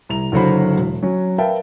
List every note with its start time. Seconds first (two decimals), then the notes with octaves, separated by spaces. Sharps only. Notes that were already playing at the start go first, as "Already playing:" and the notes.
0.09 C2 A#5 F7
0.32 F#1 D3 F#3 F#4 C5 B5
0.77 E1
1.03 F#3 C#4
1.38 A#4 B4 E5 F5 G5 A5